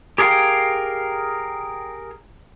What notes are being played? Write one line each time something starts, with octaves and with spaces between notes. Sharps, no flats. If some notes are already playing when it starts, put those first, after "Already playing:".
G4 G#4 A#4 B4 F5 G5